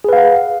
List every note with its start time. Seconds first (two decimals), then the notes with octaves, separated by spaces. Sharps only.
0.04 G#4
0.09 B4
0.13 F5
0.17 F#5